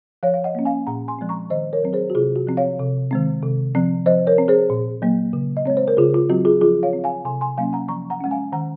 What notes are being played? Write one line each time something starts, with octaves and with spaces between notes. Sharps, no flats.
F3 C#5 F5
F5
D#5 F#5
A#3 C#4
F5 G#5
A#2 F#5 A#5
G#5 C6
F3 G#3 C4
A#5 C#6
D#3 C5 D#5
A#4 C#5
F#3 C4
G#4 C5
F#4
C3 F4 G#4
F#4
F3 C4
C#5 F5
C3
D#3 G#3 C4
C3
F3 C4
F3 C5 D#5
A#4 C#5
C4
G#4 C5
A#2
F#3 A#3
C#3
D#5
G#3 C4 C#5
C5
A#4
C#3 F4 G#4
F4
F#3 C4 F#4
F4 G#4
F3 F4 G#4
C#5 F5
C4
F5 G#5
C3 G#5 C6
G#5 C6
F#3 A#3 C#4 F5 G#5
F#5 A#5
F3 A#5 C#6
F#5 A#5
G#3 C#4 F#5
F5 G#5
D#3 F#5 A#5